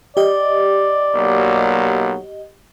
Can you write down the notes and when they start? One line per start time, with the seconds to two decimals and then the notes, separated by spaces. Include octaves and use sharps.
0.17 G4 D5 D#5
1.16 B1 F#3 A#3